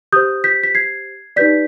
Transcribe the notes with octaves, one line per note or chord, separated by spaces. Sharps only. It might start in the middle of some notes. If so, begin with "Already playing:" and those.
G4 C5 D#6 G6
G6 B6
B6
G#6 C7
D#4 G4 B4 D5 G6 B6